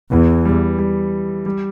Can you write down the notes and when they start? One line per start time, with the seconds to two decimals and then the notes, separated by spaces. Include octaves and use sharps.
0.11 E2 E3
0.45 G3
0.79 G3
1.46 G3